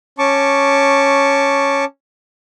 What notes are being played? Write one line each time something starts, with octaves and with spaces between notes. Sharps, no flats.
C#4 A5 C#6 D6